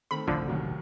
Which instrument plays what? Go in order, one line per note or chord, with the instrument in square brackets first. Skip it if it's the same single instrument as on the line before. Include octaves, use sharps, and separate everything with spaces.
[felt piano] D#3 A3 C4 [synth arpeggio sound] B5
[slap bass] F1 A#1 F#2 [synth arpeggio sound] D3 F3
[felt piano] D#2 D#3 F#3